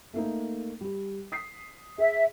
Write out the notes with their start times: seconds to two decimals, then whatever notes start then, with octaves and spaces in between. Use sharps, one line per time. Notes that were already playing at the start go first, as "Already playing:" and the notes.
0.14 A3 A#3 D#4
0.81 G3 G4
1.32 D#6 B6 C7
1.98 G#4 E5